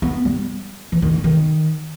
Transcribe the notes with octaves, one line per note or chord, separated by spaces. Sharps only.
B3
G3
E3
D#3
D3
D#3